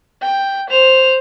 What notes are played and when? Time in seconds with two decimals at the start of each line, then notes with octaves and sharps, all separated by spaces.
0.22 G5
0.70 C5 F7